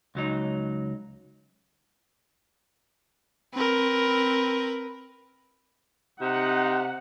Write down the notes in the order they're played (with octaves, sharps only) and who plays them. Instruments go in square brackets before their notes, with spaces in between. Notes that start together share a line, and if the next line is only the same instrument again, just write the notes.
[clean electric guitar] C#2 F#3 D#4
[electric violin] C4 A#4 [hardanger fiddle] B4
[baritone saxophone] C3 [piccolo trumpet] D#4 [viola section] F#5